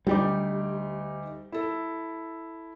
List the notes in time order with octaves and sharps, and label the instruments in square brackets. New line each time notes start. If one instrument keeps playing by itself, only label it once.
[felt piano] D2 D#4 D6 [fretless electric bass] G3
[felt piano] E4 A4